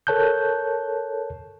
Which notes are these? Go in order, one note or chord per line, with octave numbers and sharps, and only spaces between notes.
A4 A#4 C#5 A5 F#6 G6